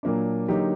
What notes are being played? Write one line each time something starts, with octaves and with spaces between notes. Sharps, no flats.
A#2 F#3 A#3 D4
D3 F#3 A#3 D#4 G4